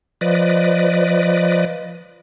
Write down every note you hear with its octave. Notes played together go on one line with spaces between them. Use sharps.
F3 B4 D5 D#5